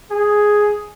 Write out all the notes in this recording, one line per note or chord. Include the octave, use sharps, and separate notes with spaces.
G#4